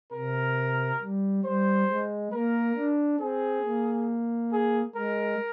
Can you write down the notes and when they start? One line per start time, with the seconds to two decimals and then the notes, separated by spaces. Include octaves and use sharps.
0.13 C3 A#4
1.01 G3
1.44 G3 C5
1.89 G#3
2.33 A#3 A#4
2.76 D4
3.20 C4 G#4
3.64 A#3
4.52 G#4
4.95 G#3 A#4